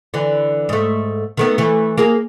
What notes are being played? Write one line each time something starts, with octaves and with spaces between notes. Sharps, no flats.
D3 E3
G#2 A3
D#3 A3 B3
E3 A3
A#3 G#4